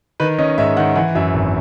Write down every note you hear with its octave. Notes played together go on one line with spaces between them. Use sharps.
D#3 B4
C#4 D#5
G#2 E5
D#3 F#5
E3 F#5
F#2 E5
G#1